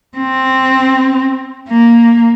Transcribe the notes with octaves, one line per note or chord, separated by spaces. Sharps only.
C4
A#3